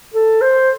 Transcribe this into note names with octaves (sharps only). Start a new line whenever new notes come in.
A4
C5